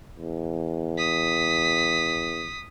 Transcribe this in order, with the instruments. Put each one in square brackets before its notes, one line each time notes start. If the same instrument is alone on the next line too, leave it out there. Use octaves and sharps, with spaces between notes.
[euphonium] E2
[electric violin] D#6 B6